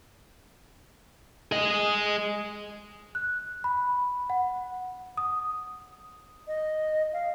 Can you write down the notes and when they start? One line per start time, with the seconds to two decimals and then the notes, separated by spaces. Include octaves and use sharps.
1.52 G#4 D#5
3.15 F#6
3.64 B5
4.30 F#5
5.17 D#6
6.47 D#5
7.13 F5